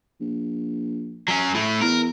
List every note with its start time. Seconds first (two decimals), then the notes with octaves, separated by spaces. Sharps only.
0.20 A#1
1.28 F#3 C#4
1.54 A2 A3
1.81 E2 A#4